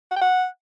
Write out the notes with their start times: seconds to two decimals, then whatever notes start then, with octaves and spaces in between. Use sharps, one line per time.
0.11 F#5
0.16 G5
0.22 F#5